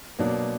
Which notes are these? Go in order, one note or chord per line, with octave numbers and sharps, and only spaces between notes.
B2 F#3 A#3 D4